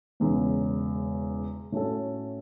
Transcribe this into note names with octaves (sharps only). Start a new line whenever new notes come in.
E1 E2 C#3
A2 A3 C#4 F#4 A4